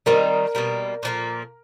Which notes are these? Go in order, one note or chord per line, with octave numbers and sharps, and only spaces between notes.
D#3 G3 C4 D#4 A#4
B2 G3 A#3
A#2 F3 A#3